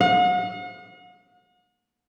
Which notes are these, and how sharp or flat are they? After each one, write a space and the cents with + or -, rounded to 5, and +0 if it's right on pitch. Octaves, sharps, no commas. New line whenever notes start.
F#5 -45